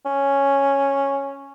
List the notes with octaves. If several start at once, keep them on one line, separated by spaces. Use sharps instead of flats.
C#4